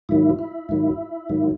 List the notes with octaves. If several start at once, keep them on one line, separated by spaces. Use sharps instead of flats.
G#2 D#3 F#3 E4
E4
G#2 D#3 F#3
G#2 D#3 F#3